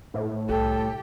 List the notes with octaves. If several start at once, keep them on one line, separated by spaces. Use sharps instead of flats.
A2
C2 G4 A4